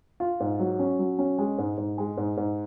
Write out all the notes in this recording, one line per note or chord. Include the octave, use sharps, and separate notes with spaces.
F4
G#2
F#3
C#4
F#3
C#4
G#3
G#2
G#2
G#3
G#2
G#2